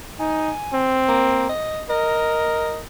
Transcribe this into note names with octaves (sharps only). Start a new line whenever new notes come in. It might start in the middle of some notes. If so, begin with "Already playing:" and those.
D#4 G#5
C4
A#3
D#5
A#4 D#5